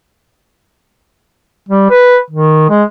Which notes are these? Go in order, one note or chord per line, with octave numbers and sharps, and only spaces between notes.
G3
B4
D#3
G#3